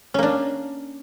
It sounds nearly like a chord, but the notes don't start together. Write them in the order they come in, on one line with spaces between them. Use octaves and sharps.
C#4 A#3 D4